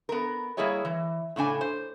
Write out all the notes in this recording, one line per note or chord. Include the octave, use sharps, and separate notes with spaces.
B3 A#4
G3 A#3 E4 G#4 C#5 D#5
E3
A2 C#3 D4 G#5
C5